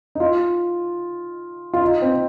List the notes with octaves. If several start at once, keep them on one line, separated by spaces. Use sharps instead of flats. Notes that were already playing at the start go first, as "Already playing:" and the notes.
D#4
F4
F4
D#4
C4